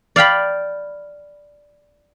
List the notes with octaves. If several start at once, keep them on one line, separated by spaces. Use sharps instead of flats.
D5 F5 G5 B5